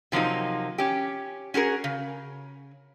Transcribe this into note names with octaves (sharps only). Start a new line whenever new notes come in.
C3 F3 F#3 A#3 D#4
C#4 G4
C#4 F#4 G#4 A#4
C#3